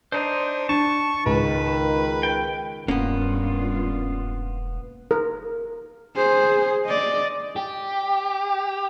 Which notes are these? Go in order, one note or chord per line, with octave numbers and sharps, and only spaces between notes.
D4 D#4 C5
D4 A5 C#6
C#2 D#3 B4
G5
E1 G2 A#3 B3 C#4 F4
A#4
G#4 C5
D5 D#5
G4